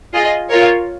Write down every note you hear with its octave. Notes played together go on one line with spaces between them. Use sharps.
F4 G#4 D#5
F4 A#4 C#5